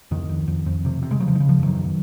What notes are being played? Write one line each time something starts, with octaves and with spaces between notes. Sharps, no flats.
F2 D#3
F2
F2
F2
C3
C3
G#3
C#3 F#3
F3
D#3
C#3
F3
F#2 D#3 F#3
F#2